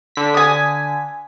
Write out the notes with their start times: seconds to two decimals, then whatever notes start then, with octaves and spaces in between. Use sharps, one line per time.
0.16 D3 B6
0.34 G#5 D#6